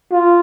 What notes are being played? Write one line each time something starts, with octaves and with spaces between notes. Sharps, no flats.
F4